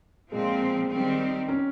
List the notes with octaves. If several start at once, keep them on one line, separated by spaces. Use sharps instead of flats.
A#2 F3 G#3 C4
D#3 G3 C4
C#4